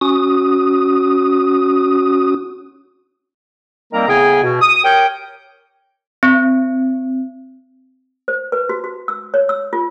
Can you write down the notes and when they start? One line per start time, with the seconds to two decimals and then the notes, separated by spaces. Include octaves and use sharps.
0.01 C#4 F#4 D#6
3.92 D#3 G3 A#3 C4 A#4 A#5
4.08 A2 C#3 B3 G#4 G5 G#5
4.43 B2
4.61 D#6
4.84 G4 A#4 C#5 G5
6.23 C4
8.28 C5
8.52 B4
8.69 F#4
8.84 F#4
9.08 E6
9.34 C#5
9.49 E6
9.73 F4